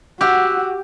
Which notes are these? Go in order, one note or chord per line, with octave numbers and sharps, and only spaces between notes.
F#4 G4 F#5 E6 F#6